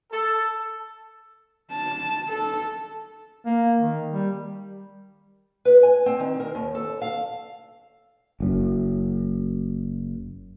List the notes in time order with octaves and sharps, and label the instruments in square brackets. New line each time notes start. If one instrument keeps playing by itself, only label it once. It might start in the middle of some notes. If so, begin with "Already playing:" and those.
[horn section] A4
[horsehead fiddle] A5
A4
[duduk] A#3
D#3
G3
[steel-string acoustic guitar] B4
G#5
C4
D#3
A#4
D#2
A4
F5
[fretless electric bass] F#1 F#2